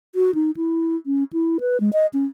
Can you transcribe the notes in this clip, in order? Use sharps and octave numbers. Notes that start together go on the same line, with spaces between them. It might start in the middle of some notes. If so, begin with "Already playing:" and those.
F#4
D#4
E4
C#4
E4
B4
G#3
D#5
C#4